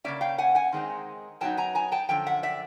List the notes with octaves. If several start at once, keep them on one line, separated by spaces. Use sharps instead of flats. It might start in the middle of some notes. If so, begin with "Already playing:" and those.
C#3 F3 A#3 C#4 D5 E5
F5 G5
F#5 G#5
F#5 G#5
D#3 G#3 C4 D#4
F#2 C#3 F#3 B3 D#4 G5 A5
G#5 A#5
G#5 A#5
G5 A5
F#2 D3 F3 G5
E5 F#5
D5 E5